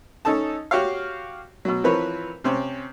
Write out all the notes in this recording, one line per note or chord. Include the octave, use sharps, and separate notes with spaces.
C#4 D#4 A4 D#5 A5
F#4 G4 C#5 F5
B2 F#3
E3 F3 C4 A#4 B4 C#5
C3 C4 C#4